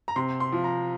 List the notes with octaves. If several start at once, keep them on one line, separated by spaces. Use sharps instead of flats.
A#5
C3 C6
C6
F3
A#5